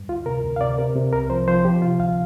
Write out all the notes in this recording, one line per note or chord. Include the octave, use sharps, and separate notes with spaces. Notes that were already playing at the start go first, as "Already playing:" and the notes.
Already playing: G2
D2 F4
C3 A#4
D2
F5
C3 D5
C3 A#4
C3
C2 A#4
F3 C5
F3 C5
F3 G4
C3 F4
D2 F5